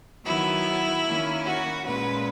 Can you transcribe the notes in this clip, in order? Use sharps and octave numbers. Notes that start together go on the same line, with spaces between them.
D#3 F#3 B3 E4
D#3 A#3 C#4
F#4
A#2 G#3 C#4 B4